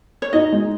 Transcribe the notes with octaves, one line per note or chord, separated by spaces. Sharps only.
C#5
D#4 D#5
G#3